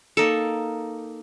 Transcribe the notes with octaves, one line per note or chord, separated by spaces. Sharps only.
A#3 D#4 A4